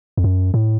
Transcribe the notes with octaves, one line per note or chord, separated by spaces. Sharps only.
F2
F#2
A2